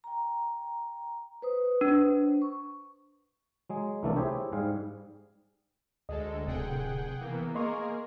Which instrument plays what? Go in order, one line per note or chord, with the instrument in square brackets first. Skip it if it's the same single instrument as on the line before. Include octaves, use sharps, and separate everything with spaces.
[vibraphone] G5 A#5
B4 C5 D#6
[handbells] D4
[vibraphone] C#6
[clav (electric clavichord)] F#3 G#3 G#4
C2 E3 A3 A#3 D4 A4
E4 G4 G#4 C5 C#5 E5
G#2 G3 G#4 F5
[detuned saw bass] D2 [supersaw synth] G#3 A4 [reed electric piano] D#5
[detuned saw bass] D1 [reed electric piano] C3 [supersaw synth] G#4 F#5 G5
[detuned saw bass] E3 [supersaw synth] A#3 B3
[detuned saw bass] A#3 [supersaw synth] G#4 A#4 [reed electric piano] D#5 C6 C#6